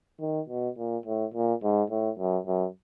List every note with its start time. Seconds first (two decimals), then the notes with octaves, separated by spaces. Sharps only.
0.21 D#3
0.49 B2
0.78 A#2
1.06 A2
1.34 A#2
1.63 G#2
1.90 A2
2.19 F#2
2.47 F#2